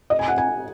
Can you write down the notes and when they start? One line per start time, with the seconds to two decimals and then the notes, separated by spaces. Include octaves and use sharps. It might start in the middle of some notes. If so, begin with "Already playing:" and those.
0.10 D#5
0.19 G#5
0.28 F#5
0.38 G#5